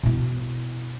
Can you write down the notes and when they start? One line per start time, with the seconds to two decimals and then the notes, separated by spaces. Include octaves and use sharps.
0.03 B2 E4